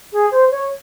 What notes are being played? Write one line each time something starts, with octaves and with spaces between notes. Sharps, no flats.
G#4
C5
C#5